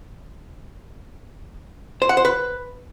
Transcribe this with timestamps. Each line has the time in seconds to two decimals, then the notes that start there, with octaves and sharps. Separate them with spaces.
2.02 C5
2.09 F#5
2.17 C5
2.25 B4